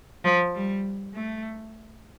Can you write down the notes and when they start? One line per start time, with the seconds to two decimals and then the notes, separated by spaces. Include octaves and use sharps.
0.25 F3
0.55 G3
1.14 A3